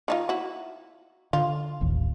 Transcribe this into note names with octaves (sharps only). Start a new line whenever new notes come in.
D#3 D#4 F4
E4 F#4
D3 F4
D#1 A1 D#2